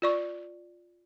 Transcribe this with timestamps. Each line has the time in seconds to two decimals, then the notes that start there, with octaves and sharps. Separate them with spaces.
0.02 F4 D5 C#6